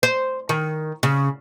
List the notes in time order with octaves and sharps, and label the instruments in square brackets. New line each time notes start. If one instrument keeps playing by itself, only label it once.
[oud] C5
D#3
C#3